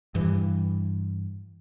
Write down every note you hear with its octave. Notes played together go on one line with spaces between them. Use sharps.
G2 E3